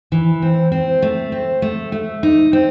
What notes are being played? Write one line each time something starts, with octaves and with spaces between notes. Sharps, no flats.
E3
C4
C4
A3
C4
A3
A3
D#4
C4